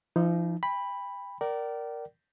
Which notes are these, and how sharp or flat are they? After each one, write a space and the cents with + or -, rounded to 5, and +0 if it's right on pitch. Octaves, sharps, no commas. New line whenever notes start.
F3 -35 D#4 +5
G5 +35 B5 +0
A#4 +0 D5 +0 G5 -40